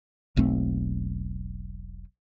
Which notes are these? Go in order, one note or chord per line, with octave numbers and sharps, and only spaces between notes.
E1 B1 A3 C4